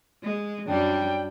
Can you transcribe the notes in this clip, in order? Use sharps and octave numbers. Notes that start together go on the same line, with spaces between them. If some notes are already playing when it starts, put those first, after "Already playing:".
G#3
F#2 G3 D4 G5